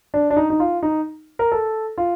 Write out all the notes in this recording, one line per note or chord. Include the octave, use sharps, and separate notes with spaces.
D4
D4
D#4
D#4
F4
D#4
A#4
A4
F4